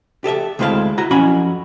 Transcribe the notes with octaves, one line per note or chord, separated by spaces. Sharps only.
G4 A4 D#5 E5
D2 G#3 C4 E4 A4 F5
E4 F#4 A#5
F2 F#3 C#4 E4 G#5 B5